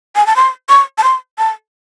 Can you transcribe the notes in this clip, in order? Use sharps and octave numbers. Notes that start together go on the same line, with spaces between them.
G#5
A5
C6
C#6
A5
C6
A5